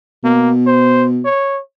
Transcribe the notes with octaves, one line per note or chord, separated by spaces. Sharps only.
B2 A#3
C5
C#5